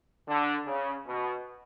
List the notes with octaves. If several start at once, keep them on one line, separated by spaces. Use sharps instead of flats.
D3
C#3
B2